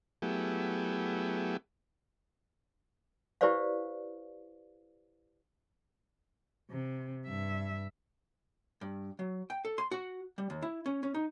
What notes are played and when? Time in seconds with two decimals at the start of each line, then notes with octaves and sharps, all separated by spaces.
0.22 F#3 A3 B3 E4 G4 G#4
3.41 E4 G4 B4 C5 D5 F5
6.71 C3
7.26 G2 E5
8.81 G2
9.19 F#3
9.50 G5
9.65 A4
9.78 C6
9.91 F#4
10.38 G3
10.50 D#2
10.62 E4
10.86 C#4
11.03 C#4
11.14 D#4